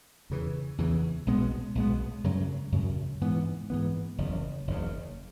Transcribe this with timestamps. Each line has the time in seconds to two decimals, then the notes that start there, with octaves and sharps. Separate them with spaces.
0.30 E2 C#3 E3
0.78 E2 C#3 E3
1.27 B1 B2 G#3 B3
1.75 B1 B2 G#3 B3
2.24 F#2 C#3 F#3
2.72 F#2 C#3 F#3
3.21 G#2 E3 B3
3.70 G#2 E3 B3
4.18 F#1 E2 C#3
4.67 F#1 E2 C#3